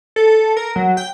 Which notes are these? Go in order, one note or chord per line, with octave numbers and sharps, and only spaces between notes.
A4
A4
A#4
F#3
G5